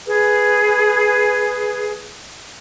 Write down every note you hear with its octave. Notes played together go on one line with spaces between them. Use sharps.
G#4 B4